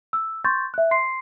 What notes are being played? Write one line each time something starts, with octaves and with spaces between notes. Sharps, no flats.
E6
C6 C#6 G6 A6
E5 F#6
C6 C7